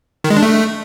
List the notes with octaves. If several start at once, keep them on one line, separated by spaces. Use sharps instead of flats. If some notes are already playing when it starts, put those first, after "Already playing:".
D#3
G#3
D4
A3